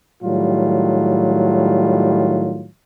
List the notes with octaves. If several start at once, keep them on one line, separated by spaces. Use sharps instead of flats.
A2 D#3 F#3 G3 F4